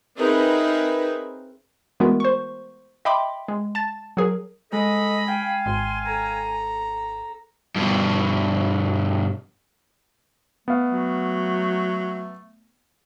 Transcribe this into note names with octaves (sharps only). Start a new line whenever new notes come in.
C4 D#4 G#4 A#4 B4 E5
E3 G#3 A3 B3 F#4 A#4
C5 C#6
D#5 E5 G5 B5 C6 D6
G#3
A5 A6
F#3 G#4 A#4
G#3 A4 D#5 B5
F5 G5 G#5
G#1 C6
A4 A#5
G2 B2
A3 B3 F5
F#3